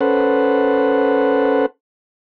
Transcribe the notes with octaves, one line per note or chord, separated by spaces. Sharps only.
C#4 A4 B4 C5 F#5